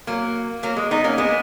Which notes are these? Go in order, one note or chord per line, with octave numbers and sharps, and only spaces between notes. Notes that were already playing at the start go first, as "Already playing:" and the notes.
F#3 A#3
F#3 A#3
G#3
B3 D#4
A#3 C#4
G#3 B3